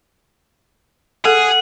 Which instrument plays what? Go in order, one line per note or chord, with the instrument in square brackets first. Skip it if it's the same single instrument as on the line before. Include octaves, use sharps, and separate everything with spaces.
[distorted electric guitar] G#4 [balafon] A4 [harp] F#5